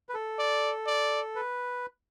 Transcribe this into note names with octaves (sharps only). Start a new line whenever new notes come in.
B4
A4
D5
D5
B4